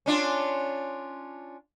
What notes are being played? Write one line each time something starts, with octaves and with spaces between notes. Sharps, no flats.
C#4 D4 F4